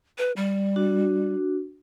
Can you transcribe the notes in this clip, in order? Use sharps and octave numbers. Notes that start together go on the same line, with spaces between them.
B4
G3
D4 F#4